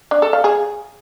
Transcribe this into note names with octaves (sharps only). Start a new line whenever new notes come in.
D4
A4
F5
G#4